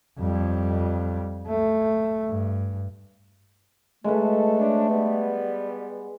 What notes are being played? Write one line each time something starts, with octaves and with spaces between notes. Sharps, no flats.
F2 G3
A3
G2
B1 G#3 A3 A4 B4
G#2 C#4 D4
G3 B3